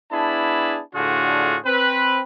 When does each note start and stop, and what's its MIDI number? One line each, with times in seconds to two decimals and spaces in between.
0.12 0.80 59
0.12 0.80 62
0.12 0.80 64
0.12 0.80 68
0.12 0.80 81
0.12 0.80 83
0.95 1.59 45
0.95 1.59 50
0.95 1.59 62
0.95 1.59 65
0.95 1.59 66
0.95 1.59 68
1.65 2.22 60
1.65 2.22 71